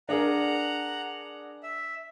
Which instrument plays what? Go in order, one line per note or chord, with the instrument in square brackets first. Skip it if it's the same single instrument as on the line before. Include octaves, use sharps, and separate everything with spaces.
[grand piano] D4 G#4 A#4 [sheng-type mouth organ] F#5 A#5
[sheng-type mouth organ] E5